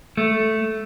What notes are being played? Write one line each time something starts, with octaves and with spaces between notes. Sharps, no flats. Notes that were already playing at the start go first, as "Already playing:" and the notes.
A3